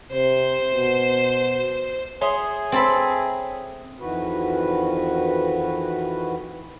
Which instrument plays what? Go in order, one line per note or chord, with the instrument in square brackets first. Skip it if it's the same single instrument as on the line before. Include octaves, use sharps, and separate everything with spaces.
[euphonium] C3 [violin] C5
[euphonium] B2
[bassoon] G#4 [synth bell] C#5 E5 D#6 [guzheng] C6
[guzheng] C4 A4 B5
[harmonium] F2 D#3 E3 F#4 B4